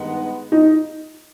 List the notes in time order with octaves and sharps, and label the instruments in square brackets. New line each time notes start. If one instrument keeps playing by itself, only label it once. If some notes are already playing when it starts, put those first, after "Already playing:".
Already playing: [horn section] G2 D#3 G#3 B3 D#4
[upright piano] D#4